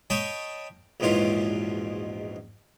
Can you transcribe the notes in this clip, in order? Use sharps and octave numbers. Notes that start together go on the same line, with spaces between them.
C#5 D#5 G5 A5 B5 D#6
A#1 E2 G#2 B2 C#4 F4